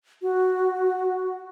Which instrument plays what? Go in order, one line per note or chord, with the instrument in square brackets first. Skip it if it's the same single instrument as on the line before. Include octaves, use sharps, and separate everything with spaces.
[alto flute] F#4